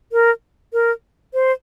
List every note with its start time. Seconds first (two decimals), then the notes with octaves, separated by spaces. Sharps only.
0.12 A#4
0.73 A#4
1.34 C5